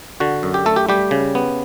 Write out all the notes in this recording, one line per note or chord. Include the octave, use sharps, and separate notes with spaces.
D3 F#4
F#2
G4
A3 A4
G4
G3 G4
C#3
B3